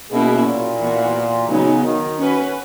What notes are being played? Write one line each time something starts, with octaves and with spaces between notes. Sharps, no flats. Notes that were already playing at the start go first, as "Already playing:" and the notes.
B2 F#3 A#3 C#4 E4 G#4
A#2
E3 B3 F#4
C#3 F#3 B3 D#4
D#3
C#4 F#4 B4